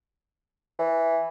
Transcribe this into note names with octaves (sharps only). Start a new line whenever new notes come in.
E3